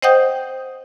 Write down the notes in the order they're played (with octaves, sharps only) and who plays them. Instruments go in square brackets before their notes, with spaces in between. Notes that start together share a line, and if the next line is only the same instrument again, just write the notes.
[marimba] C5 D#5 F#5 G5 D#6 G6